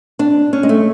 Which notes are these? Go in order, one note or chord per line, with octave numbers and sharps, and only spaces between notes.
D4
C#4
G#3
A3